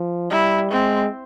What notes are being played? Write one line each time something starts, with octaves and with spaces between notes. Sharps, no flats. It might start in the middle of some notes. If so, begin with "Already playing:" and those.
Already playing: F3
G3 E4
G#3 C4